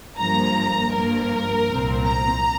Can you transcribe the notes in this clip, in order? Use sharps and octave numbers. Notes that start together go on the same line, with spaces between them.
G2 F3 A#3 A#5
G2 F3 A#3 A#4
C2 A#2 F3 C4
A#5